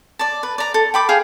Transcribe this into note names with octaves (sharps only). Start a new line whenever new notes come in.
D5 A5
B4
D5 A#5
A4
G5 B5 D6
G#4 F5 G5